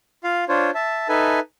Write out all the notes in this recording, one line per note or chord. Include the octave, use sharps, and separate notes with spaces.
F4 F5
D4 F4 C5 C#5
E5 A5
D#4 A4 B4 E5 G#5